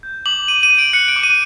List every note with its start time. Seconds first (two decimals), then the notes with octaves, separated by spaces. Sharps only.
0.03 G6
0.26 D6 F#7
0.48 D6 D#7
0.63 D#7
0.71 G6
0.78 D7
0.93 F#6 C#7
1.08 D7
1.16 D6
1.23 D#7